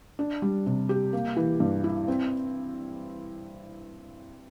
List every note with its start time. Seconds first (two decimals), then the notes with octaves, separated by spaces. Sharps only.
0.19 D4
0.42 G3
0.66 C3
0.89 G4
1.13 A#3
1.37 E3
1.60 G2
1.84 E4
2.08 C4